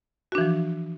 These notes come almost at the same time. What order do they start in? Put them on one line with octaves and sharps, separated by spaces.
F#4 D4 E3 F3